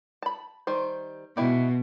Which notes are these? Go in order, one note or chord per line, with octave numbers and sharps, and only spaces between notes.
A5 B5
D#3 G3 C5
B2 G#3 E4 G4